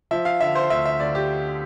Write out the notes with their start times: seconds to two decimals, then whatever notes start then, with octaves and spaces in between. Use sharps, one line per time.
0.11 F3 E5
0.25 F5
0.41 D3 E5
0.55 C5
0.70 D2 E5
0.85 E5
1.00 D2 D5
1.15 G4